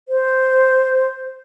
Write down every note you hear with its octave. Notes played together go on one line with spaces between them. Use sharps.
C5